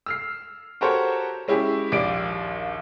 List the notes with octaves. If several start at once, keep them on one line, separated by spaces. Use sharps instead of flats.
E6 F6 C7
F#4 G4 A4 A#4 C5 C#5
G#3 C#4 E4 G4 G#4
A#1 D#2 G4 D5 D7